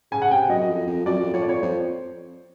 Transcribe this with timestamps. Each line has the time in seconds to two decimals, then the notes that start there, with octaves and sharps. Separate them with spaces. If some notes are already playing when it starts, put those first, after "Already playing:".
0.12 C#3 G#5
0.22 F#5
0.31 C3 G5
0.49 F#2 D#5
0.68 F2
0.87 F2
1.06 F#2 D5
1.20 F2
1.34 F2 C#5
1.42 D5
1.47 F2 C#5
1.62 F2 C5